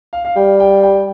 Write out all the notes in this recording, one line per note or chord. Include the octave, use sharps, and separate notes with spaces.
F5
F5
G3 G5
G5
G5